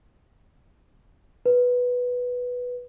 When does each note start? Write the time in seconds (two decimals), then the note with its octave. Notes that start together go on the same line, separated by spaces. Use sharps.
1.46 B4